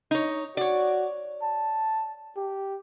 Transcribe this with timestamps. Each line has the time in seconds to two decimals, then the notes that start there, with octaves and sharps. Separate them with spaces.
0.11 D#4 C#5
0.57 F#4 C#5 D5
1.42 A5
2.37 G4